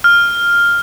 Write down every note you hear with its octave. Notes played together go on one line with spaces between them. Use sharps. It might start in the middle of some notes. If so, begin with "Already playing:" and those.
F6